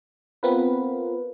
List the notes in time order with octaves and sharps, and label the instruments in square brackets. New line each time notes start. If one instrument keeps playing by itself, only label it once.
[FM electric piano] B3 C4 F4 A#4 B4